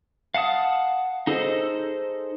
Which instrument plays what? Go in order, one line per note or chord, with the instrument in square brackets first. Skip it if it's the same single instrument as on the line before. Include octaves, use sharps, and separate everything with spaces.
[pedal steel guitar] F5 F#5 A5 D#6
D#4 G#4 A4 C5 D#5